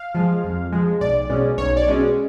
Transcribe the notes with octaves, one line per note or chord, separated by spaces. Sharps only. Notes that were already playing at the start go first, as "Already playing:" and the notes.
Already playing: F5
F3 G#3
F2
F3 G#3
B1 D5
B2 G#3 C#4
B1 C#5
D5
B2 G#3 C#4